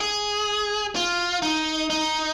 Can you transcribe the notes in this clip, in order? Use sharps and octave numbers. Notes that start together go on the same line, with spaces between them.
G#4
F4
D#4
D#4